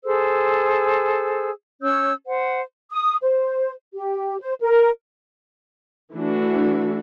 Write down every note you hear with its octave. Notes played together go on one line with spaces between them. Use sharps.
G#4 A4 C5 E6
C#4 C#5 E6 G6
C5 F#5
D#6
C5
G4
C5
A#4
E3 A3 D4 F#4